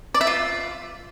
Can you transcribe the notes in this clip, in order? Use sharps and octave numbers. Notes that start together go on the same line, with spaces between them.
D5
E5
F4